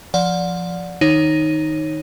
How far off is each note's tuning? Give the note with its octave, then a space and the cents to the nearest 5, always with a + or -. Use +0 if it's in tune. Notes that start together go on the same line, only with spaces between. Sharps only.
F3 +0 D5 -10 F#5 -30
D#3 +0 D#4 +0 C#5 -15